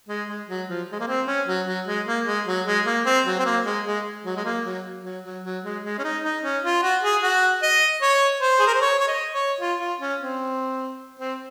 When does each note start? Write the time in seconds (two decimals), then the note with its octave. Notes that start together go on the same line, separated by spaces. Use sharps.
0.09 G#3
0.28 G#3
0.49 F#3
0.69 F3
0.92 G#3
1.00 A#3
1.08 C4
1.27 C#4
1.48 F#3
1.67 F#3
1.87 G#3
2.07 A#3
2.26 G#3
2.47 F#3
2.66 G#3
2.86 A#3
3.06 C4
3.26 F#3
3.39 C4
3.46 A#3
3.66 G#3
3.86 G#3
4.26 F#3
4.37 G#3
4.45 A#3
4.65 F#3
5.04 F#3
5.24 F#3
5.44 F#3
5.64 G#3
5.84 G#3
5.99 C#4
6.04 D#4
6.23 D#4
6.44 C#4
6.64 F4
6.83 F#4
7.03 G#4
7.22 F#4
7.62 D#5
8.02 C#5
8.41 C5
8.59 G#4
8.67 A#4
8.75 C5
8.82 C#5
8.99 C#5
9.08 D#5
9.35 C#5
9.61 F4
9.80 F4
10.00 C#4
10.20 C4
11.20 C4